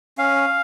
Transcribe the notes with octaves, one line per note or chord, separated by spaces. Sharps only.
C#4 F5